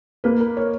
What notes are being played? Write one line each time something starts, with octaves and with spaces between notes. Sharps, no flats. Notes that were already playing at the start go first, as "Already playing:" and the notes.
A#3 B4
A#4
C#5